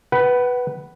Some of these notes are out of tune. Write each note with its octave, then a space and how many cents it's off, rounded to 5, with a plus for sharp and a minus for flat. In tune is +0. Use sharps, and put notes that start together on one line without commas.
B4 +0 F#5 +30